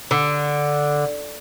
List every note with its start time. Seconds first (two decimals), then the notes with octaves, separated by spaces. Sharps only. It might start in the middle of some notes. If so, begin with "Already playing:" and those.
0.11 D3